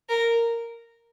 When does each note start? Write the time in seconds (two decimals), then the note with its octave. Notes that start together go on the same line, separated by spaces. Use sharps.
0.09 A#4